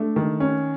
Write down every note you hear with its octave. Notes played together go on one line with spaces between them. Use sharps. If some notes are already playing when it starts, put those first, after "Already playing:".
Already playing: A3 D4
D#3
C#4